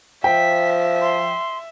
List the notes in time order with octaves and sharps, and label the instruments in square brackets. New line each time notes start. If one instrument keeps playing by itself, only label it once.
[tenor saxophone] F3 [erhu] E5 [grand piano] G5 [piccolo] B6
[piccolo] C6